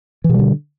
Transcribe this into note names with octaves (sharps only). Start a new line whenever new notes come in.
B2 D3 E3 G3